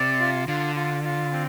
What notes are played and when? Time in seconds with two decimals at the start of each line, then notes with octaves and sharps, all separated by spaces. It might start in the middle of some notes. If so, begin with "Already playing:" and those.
Already playing: C3 D5
0.20 F4
0.48 D3 F4
0.75 F4
1.04 F4
1.32 C4